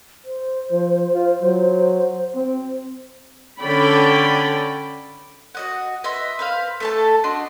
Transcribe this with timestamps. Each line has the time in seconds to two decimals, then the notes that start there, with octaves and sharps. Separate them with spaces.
0.25 C5
0.71 F3
1.13 F4
1.42 F#3
2.35 C4
3.61 D3 C#4 D5 G5 B5
5.55 F#4 D#5 F#5
6.04 B4 D#5 E5 C6
6.39 B4 C5 F5
6.80 A3 A4 A5
7.24 D4 F#4 D#5 C6